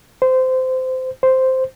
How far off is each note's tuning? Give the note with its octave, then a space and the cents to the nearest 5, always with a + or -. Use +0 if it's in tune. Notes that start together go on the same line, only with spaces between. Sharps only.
C5 -20
C5 -5